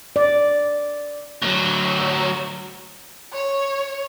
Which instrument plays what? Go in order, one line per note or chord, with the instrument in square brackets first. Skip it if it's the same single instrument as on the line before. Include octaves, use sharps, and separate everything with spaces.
[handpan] D5
[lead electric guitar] D2 F#3
[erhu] C#5